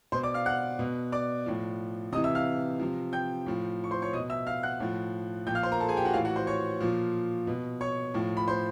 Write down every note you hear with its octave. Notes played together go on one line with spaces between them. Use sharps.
B2 C5 C6
D5 D6
F5 F6
F#5 F#6
B2
D5 D6
A2 F3
C3 E3 D#5 D#6
E5 E6
F5 F6
C3 F3
G5 G6
A2 F3
C#6
C5 C6
C#5 C#6
B2 D#5 D#6
E5 E6
F5 F6
F#5 F#6
A2 F3
A#2 F3 G5 G6
F5 F6
C5 C6
A#4 A#5
A4 A5
G#4 G#5
G4 G5
F#4 F#5
A2 E3 F4 F5
F#4 F#5
C5 C6
C#5 C#6
A#2 F3
B2
C#5 C#6
A2 F3
B5
C5 C6